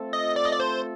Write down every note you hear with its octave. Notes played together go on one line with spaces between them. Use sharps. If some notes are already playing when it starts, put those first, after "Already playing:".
Already playing: A3 C4 F4 A4
D#5
D5
D#5
D5
C5